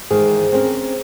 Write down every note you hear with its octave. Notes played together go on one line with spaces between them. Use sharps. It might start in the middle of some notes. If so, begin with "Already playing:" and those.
G#2 D#3 E3 G#4 C5
C4 C#4 A#4